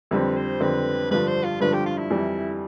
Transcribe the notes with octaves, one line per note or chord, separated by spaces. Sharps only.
F2 D3 G3 C4 B4
C5
F2 D3 G3 C4 B4
G2 D3 F3 B4
C5
F4
G2 D3 F3 B4
G4
F4
E4
F2 E3 G3